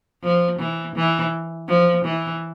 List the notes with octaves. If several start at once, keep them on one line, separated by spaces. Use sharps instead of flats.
F3
E3
E3
F3
E3